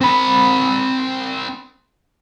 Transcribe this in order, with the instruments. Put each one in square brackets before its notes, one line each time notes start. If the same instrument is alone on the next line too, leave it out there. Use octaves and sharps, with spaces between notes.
[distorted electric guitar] C4 B5